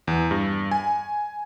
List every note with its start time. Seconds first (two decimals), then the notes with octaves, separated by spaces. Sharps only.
0.07 E2
0.31 G2
0.71 G#5